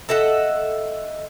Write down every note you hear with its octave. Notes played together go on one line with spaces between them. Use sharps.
A4 D#5 E5 F#5